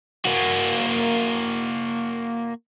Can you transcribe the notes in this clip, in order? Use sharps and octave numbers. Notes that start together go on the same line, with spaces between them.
A#3 F#4